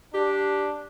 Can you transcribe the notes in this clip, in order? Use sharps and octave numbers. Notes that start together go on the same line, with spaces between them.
D4 G4